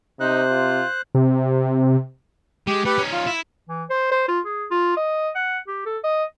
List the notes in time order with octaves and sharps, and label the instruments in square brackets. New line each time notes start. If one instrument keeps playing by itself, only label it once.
[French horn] C3 [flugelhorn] D#4 [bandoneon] C5 F#6
[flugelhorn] F4
[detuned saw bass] C3
[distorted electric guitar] G#3 [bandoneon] G4
[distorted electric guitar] A3 [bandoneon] G4 B4
[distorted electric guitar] C#4 D#4
[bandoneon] F4
[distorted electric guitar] E4
[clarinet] E3
C5
C5
F4
G#4
F4
D#5
F#5
G4
A4
D#5